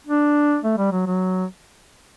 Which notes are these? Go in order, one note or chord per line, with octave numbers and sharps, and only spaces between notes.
D4
A3
G3
F#3
F#3